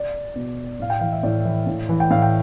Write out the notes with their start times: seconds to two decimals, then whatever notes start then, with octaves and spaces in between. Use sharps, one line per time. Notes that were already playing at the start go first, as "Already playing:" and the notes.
Already playing: D5
0.36 B2
0.80 A2 F5
0.90 G5
1.01 E3 F5
1.12 E5
1.23 A2 D5
1.45 E3
1.67 A2
1.89 E3
2.00 G5
2.11 A2 F5
2.22 G5